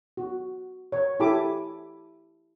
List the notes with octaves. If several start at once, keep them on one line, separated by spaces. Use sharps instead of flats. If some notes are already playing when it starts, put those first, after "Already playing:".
F#4
C#5
E4 G4 A4 G#5 B5 D6